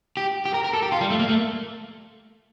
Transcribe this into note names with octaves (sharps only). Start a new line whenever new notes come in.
G4
G4
A#4
A#4
A4
G4
F4
G3
A3
A#3
A3